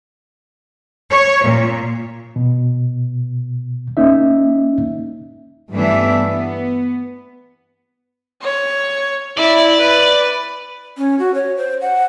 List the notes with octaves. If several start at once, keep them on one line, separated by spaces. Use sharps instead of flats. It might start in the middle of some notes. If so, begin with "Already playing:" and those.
C#5
A#2
B2
A#3 C#4 D#4 E5
G2 E3 A3 B3 D4 E5
B3
C#5
E4 D5
B4
C#4
F#4
C#5
C5
F#5